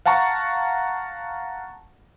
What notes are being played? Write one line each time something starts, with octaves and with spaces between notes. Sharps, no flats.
F5 F#5 A5 A#5 C#6